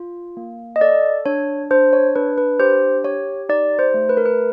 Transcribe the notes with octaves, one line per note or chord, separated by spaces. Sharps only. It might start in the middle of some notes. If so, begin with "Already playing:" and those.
Already playing: F4
A#3
D#5
A4 D5
D4 C#5
D4 C5
C#5
D4 B4
B4
G4 C5
G4 C#5
D#4 D5
C5
A3
B4
A#4
B4